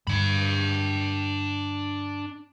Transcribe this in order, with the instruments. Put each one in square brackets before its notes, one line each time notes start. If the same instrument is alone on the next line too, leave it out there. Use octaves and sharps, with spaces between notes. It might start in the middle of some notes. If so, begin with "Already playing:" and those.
[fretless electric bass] G2 D3 [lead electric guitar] D4 B5